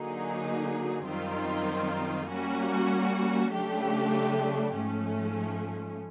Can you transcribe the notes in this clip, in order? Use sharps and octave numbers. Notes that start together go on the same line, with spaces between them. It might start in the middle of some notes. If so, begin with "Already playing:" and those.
Already playing: D3 F#3 A#3 D#4 G#4
F#2 D#3 G3 C4 F4
G3 A#3 C#4 F#4
C#3 F#3 A3 D4 G4
G#2 F3 A3 C#4